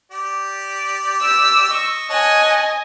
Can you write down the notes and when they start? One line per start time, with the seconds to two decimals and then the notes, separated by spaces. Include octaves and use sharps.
0.11 G4 D5
1.20 E6
1.70 D#5 C#6
2.10 C#5 D#5 F#5 G#5 A5